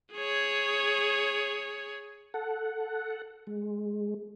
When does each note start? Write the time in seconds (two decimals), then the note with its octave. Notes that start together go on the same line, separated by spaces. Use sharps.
0.14 G#4 C#5
2.34 A4 F#5
3.47 G#3